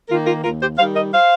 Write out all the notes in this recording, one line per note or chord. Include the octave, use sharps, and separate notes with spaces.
D#3 A#3 F4 A#4
F4 A#4
D#2 F4 A#4
G4 C5
D#3 G3 C5 F5
A#4 D#5
C5 F5